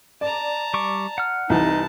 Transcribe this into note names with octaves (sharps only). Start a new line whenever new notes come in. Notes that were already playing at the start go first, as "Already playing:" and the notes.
D5 A5 A#5
G3 C#6 D6
F#5 F6
C2 E3 D#4 A5